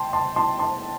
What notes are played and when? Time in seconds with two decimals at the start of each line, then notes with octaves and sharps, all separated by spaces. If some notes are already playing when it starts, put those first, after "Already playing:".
Already playing: G5 A5 C6
0.13 A5 C6
0.36 A5 C6
0.59 A5 C6